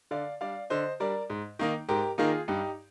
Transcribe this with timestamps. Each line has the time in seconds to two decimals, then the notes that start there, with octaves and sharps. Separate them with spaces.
0.11 D3 D5 F5
0.41 G3 D4 D5 F5
0.70 D3 C5 D#5
1.00 G3 D4 A#4 D5
1.30 G#2
1.59 D#3 A#3 D#4
1.89 G#2 G4 A#4
2.18 D#3 A#3 D#4 F4 G#4
2.48 G2 D#4 G4